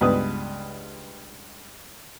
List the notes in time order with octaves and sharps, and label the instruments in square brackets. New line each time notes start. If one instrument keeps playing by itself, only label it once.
[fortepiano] C#2 G2 B3 B4 D#6